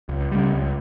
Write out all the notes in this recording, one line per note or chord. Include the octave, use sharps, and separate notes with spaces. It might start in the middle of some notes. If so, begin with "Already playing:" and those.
C#2
C#3 G3
C#2